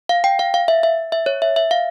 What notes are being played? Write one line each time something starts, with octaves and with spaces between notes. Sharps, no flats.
F5
G5
F5
F5
E5
E5
E5
C#5
E5
E5
F5